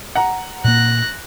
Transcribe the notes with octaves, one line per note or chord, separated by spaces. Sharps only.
F#5 A#5
A#2 A#3 F#6 A#6